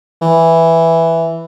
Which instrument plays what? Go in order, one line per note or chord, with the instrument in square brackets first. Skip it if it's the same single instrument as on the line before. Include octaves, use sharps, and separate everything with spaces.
[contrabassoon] E3